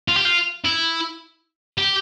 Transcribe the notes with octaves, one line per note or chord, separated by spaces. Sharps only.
F4
G4
F4
E4
G4